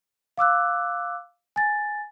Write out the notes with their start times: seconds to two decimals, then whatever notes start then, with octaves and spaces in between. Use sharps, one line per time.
0.37 F5 D6 E6 F#6
1.56 G#5 A6